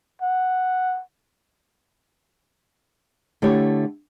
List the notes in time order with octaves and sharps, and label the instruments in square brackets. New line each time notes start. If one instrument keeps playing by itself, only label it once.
[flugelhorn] F#5
[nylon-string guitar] D3 A3 E4 G4 C#5